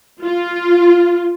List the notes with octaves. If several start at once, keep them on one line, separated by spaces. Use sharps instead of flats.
F4